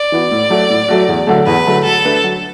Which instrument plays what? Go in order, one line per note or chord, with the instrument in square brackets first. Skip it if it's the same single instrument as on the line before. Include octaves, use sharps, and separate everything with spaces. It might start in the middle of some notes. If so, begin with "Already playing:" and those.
Already playing: [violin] D5
[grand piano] E3 B3 F#4
A2
F#3 A3 F#4
A2
F#3 A3 F#4
E2
D3 F#3 A3
[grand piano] E2 [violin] B4
[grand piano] D3 F#3 A3
[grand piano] F#3 [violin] A4
[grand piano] A3 D4 B4
F#3